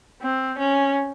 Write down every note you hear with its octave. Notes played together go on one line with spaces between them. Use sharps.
C4
C#4